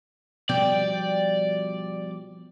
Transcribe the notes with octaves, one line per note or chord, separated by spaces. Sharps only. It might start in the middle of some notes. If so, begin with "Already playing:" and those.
B2 F3 G3 D5 G5